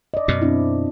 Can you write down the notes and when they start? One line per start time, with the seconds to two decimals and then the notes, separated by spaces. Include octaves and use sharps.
0.14 D5 D#5
0.28 F#2 B2
0.42 C4 D4 E4